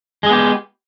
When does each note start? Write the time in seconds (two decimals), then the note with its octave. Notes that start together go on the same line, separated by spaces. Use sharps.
0.23 G#3
0.26 G#4
0.29 B3
0.33 G4